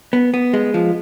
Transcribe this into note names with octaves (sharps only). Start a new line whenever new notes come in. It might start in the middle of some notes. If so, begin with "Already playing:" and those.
B3
B3
G#3
F3